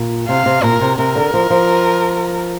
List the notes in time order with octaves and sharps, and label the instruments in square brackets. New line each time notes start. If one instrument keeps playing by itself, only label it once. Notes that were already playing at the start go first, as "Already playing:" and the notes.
Already playing: [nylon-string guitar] A#2
[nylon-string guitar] C3 [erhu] F5
[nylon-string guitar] C3
[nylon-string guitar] A#2 [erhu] A#4
[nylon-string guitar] C3
[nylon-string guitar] C3 [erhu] A#4
[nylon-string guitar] D3
F3
F3